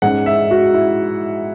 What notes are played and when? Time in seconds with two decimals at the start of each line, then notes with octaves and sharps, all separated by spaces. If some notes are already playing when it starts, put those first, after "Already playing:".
0.02 G#2 G#3 C#4 F#5
0.26 E5
0.51 F#4
0.74 E4